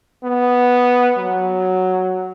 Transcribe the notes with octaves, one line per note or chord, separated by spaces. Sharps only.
B3
F#3